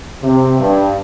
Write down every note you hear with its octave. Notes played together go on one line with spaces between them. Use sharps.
C3
G2